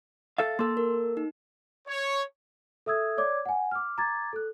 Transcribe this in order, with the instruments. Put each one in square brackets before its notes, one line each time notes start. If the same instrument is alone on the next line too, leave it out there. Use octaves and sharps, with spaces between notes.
[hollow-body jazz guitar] A4 E5 F5 [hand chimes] A6
[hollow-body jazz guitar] A#3 A4 [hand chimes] C6
[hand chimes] A#4
D#4
[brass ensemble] C#5
[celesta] A4 E5 D#6 E6 G#6
C#5 D5 D6 G#6
F#5 G#5
D6 F6
A#5 D6 G#6 A6
A4 F#6